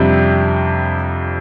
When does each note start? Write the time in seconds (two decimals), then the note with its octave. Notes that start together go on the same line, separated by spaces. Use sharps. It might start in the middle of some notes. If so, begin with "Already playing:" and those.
Already playing: F2 C3 G3 D4 G4